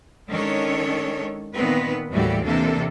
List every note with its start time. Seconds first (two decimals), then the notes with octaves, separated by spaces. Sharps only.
0.29 D#3 G#3 C#4 D4 A4 C#5
1.54 A#2 D#3 B3 C4 B4
2.11 D#2 A2 E3 G3 F#4 G4
2.45 C3 E3 A#3 D4 A4